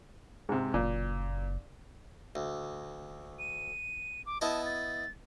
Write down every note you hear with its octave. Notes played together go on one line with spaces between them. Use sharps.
G#2 C3 G#3
F#1 A#2
D2
D#7
D6
B3 E4 D#5 A5
A6